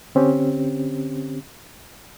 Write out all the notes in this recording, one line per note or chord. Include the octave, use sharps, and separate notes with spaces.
D3 C4 C#4 G4